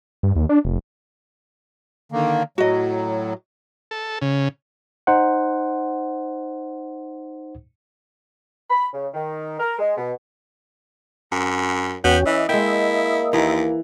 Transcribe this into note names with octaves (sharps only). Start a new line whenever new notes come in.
G2
D#2
D4
F1
D3 D#3 A#3
A2 F#3 F#4 D#5
A4
C#3
D#4 C5 F#5
B5
C#3
D#3
A#4
G#3
B2
F#2
E2 B3 C#4 F#4 G5
E3 D#5 E5
G#3 A#3 E4 G5
D#2 E3